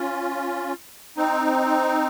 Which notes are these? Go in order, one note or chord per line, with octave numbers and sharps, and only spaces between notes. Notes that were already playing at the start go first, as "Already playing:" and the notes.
Already playing: C#4 F4
C4 D#4